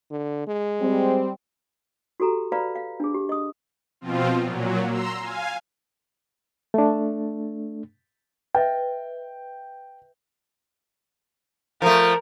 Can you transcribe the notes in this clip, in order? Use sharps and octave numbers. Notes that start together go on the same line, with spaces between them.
D3
G#3
G3 C4
F#4 G4 A4 A#5
B4 D5 F5 A#5 B5
F5
D4 G#4
G4
D#5 D#6
B2 F3 C4 F4
A#2 F#3
A#5 C6 E6
F5 G#5
A3 D4
B4 D#5 E5 G5
F3 A3 A#4